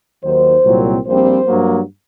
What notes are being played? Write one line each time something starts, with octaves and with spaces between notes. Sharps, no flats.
D#2 D#3 F#3 C5
C2 A#2 F#3 C4
A#1 A#2 G3 C4 C5
G2 F#3 A#3